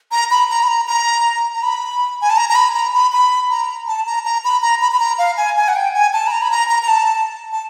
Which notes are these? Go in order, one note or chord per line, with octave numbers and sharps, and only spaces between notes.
A#5
B5
A#5
B5
A#5
A#5
A#5
B5
G#5
A5
A#5
A#5
B5
A#5
B5
B5
A#5
A5
A#5
A#5
B5
A#5
B5
B5
A#5
F5
G#5
G#5
F#5
G5
G#5
A5
B5
A#5
B5
A#5
A#5
A#5
A5
A5